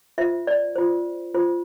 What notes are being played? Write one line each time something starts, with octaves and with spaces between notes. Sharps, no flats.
F4 C5 E5
D5
F4 C5
F4 C5